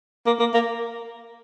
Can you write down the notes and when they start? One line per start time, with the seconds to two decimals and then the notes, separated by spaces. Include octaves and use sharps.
0.26 A#3
0.39 A#3
0.54 A#3